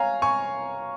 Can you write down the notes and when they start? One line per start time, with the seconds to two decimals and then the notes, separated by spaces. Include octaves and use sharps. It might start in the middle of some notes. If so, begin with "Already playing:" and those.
Already playing: C#5 F5 G#5 A#5
0.22 G#5 C#6